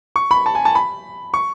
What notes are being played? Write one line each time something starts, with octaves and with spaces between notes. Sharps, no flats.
C#6
B5
A5
G#5
A5
B5
C#6